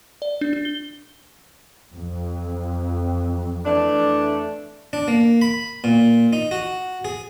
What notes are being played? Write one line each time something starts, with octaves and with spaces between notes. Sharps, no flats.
D5
D4
D4
G7
F2
E3 A3 D4
D4
A#3
B5
A#2
D#4
F#4
G#4